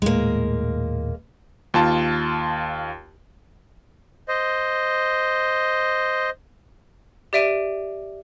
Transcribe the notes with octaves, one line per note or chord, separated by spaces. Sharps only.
D#1 A2 G#3 A#3
D#2 F4 A5
C5 D#5
G4 D5 E5 D7 D#7